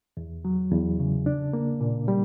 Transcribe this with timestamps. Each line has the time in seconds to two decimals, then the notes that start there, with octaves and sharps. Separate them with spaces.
0.17 E2
0.45 F#3
0.71 E2
0.99 C#3
1.26 D4
1.53 A#3
1.81 A#2
2.08 G3